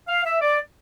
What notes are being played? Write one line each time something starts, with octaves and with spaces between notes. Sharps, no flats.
F5
E5
D5